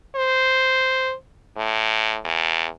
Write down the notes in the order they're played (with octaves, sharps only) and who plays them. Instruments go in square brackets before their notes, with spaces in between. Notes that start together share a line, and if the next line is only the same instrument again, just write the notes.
[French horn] C5
A2
E2